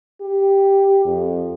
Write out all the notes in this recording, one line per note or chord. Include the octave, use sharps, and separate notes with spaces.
G4
F2